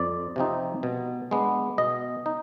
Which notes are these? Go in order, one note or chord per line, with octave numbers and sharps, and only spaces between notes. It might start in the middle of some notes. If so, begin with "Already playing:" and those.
Already playing: F2 D5
C3 F3 C4 D#4
B2
G#3 B3 D4
B2 D#5
D#4